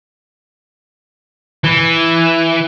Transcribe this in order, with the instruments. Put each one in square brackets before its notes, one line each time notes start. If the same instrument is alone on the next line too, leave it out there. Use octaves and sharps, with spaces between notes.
[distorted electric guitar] E3